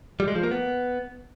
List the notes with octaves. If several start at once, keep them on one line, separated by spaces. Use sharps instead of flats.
G3
G#3
F3
A#3
B3